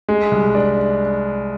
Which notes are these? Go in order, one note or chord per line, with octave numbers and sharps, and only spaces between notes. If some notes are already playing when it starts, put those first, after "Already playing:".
G#3
C2
D4